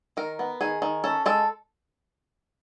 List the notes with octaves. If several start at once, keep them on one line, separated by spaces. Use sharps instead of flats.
D#3 A#4
B3
D#3 G#4
D#3
C#4 A4
G#3 A4